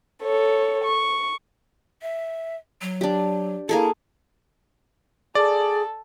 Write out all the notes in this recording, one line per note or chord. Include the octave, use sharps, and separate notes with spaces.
A4 C#5
C#6
E5
F#3
D4 G4
A#3 E4 G#4 A4
G#4 A4 D5